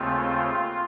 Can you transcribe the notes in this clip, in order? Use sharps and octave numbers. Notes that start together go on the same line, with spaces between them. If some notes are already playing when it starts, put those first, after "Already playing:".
Already playing: D#2 C#3 A3 C4 F4